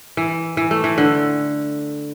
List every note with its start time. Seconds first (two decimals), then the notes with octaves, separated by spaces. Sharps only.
0.17 E3
0.57 E3
0.71 A3
0.84 E3
0.98 D3